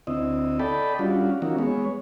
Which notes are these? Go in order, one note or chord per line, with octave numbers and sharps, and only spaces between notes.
D2 C4 E4 D#5
A4 D5 D#5 G5 A5 B5
G3 C#4 D4 F4 F#4
E3 F3 A#3 C#4 D#4 F#4
G#3 B3 C#5